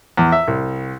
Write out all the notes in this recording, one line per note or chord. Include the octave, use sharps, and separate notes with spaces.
E2
E5
C2